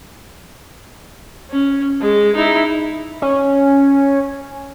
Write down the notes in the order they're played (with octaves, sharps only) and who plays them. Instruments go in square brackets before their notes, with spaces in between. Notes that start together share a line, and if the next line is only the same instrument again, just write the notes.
[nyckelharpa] C#4
G#3
D#4 E4
[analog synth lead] C#4